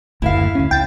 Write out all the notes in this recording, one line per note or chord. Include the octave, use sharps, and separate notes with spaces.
F#1 D2 A2 E4 E5 F5
D2 C#4
C#2 G5 A6